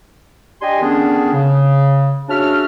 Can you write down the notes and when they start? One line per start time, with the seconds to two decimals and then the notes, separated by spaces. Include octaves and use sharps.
0.61 D4 G4 D#5 G5 G#5 C6
0.81 D3 D#3 B3 C#4 D4 G#4
1.33 C#3
2.29 C#3 D4 F#4 E5 F6